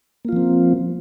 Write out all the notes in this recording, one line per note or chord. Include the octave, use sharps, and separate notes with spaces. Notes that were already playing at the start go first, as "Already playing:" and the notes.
F3 A#3 C4 F4